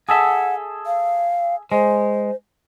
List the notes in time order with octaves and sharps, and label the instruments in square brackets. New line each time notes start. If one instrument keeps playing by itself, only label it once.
[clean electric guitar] G#4 A4 E5 [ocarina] F#5
[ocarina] F5
[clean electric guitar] G#3 [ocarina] C5